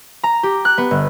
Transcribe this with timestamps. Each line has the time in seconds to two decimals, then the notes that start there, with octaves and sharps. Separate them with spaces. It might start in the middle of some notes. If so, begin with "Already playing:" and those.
0.24 A#5
0.43 G4
0.65 F#6
0.78 B3
0.91 G1